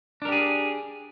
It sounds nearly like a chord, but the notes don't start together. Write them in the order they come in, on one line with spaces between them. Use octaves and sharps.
D4 A#4 G4 G#4